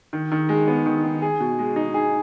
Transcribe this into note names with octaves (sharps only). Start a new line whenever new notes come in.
D#3
D#3
G#3
B3
D#3
D#3
G#4
B2
G#3
D#4
G#4